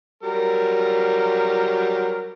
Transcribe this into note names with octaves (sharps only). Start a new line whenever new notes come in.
F#3 G3 A#4